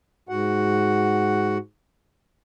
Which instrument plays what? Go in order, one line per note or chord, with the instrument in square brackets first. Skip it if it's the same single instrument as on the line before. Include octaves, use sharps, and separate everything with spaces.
[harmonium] G#2 F#4 F#5